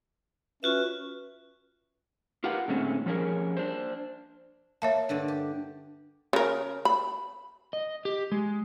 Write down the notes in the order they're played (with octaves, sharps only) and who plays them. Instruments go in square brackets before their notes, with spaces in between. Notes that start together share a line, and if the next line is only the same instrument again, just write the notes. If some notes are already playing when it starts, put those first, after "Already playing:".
[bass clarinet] C#4 [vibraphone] F4 F#4 E5 [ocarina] B4
[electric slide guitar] F4 G4 A#4 B4 F#5
A#2 D#3 G#3 A3 C4 C#4
F3 G3 C#4 G#4 A#4
D4 C5
[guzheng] A#3 [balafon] C#5 E5 A5
[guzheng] G2 D3 D5
G4
[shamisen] C#3 A#4
B5
[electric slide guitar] D#5
G4
G#3